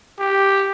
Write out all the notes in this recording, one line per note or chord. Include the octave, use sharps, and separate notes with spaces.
G4